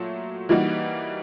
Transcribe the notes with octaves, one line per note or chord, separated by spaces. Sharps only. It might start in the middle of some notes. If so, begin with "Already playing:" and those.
Already playing: A#2 F#3 A3
E3 G3 A#3 D#4 F#4